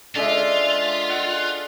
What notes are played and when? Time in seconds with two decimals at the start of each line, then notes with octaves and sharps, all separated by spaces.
0.16 D3 G#3 F4 E5
1.10 F#5